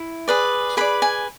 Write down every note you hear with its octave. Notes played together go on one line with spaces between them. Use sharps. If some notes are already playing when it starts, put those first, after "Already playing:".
Already playing: E4
G#4 B4 D5
G#4 B4 D5 B5
G#5